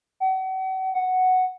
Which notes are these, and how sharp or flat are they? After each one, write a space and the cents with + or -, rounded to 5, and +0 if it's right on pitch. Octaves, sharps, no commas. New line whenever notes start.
F#5 +40
F#5 +0